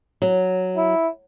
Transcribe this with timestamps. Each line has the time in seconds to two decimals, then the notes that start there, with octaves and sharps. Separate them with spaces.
0.22 F#3
0.77 E4